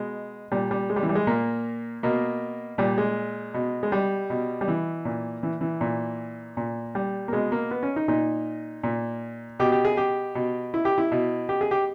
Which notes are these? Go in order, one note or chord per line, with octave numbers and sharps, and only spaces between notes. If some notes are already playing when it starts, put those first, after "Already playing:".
Already playing: B2 G#3
A#2 G3
G3
G#3
G3
E3
G3
G#3
A#2 A#3
B2 A#3
A#2 G3
G#3
B2
G#3
G3
B2
G3
E3
A#2
E3
E3
A#2
A#2
G3
A#3
B2 G#3
A#3
B3
C#4
D#4
A#2 D#4
A#2
B2 G4
G4
G#4
G4
B2
E4
G4
E4
B2
G4
G#4
G4